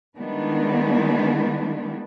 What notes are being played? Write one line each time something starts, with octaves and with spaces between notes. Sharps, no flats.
D#3 G3 G#3 B3 D4 E4